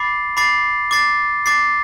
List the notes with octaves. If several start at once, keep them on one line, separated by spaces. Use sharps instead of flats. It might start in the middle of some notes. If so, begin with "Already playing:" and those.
Already playing: B5 D6 A6 C7
B5 D6 A6 C7
D6 A6 C7
D6 A6 C7